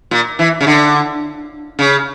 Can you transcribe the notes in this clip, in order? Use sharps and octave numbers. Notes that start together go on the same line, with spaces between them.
A#2
E3
C#3
D3
C#3